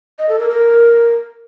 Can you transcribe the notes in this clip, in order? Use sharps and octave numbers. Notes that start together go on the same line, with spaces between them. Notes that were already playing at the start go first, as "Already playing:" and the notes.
D#5
A4
A#4
A#4